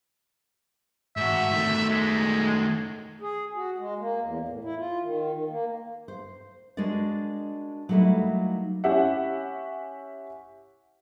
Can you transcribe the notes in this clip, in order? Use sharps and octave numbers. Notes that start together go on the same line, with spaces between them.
G#2 F#4 E5
D#3 A3
G#3
G#4
F#4
G#3
A#3
E2
A2
E4
F4
D#3
D#3
A#3
C5
G#3 D4 F#4 A#4 D5
F#3 G3 A3 A#3 D#4 E4
C#4 E4 G4 E5 F#5